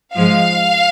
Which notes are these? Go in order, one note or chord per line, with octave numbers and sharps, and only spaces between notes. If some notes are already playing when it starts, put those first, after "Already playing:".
G#2 F3 G#3 F5